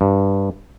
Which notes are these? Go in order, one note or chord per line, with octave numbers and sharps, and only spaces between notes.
G2